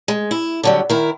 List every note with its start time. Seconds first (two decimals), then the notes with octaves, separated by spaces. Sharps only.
0.08 G#3
0.31 E4
0.63 D3 F#3 G3
0.89 D#3 E4 A#4